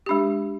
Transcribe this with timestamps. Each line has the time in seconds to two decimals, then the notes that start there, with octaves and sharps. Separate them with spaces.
0.06 G#3 D4 G4